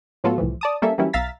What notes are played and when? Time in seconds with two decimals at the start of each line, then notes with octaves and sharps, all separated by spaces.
0.24 A2 F#3 B3 F4 F#4 A4
0.38 C2 A2 E3 F3
0.61 D5 A5 D#6
0.82 G3 A#3 C#4 A4 E5
0.98 E3 F#3 G3 A#3 C#4 E4
1.13 B1 E5 F5 A#5 A6 B6